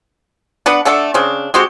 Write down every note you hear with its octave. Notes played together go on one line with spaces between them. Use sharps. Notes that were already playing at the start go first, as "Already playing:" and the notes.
B3 D4 B4 F#5
A3 D4 A4 F#5
C#3 C4 D4
G#3 C4 F#4 G4